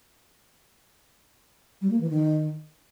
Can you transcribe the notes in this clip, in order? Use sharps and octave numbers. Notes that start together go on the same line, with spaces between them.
G3
A#3
E3
D#3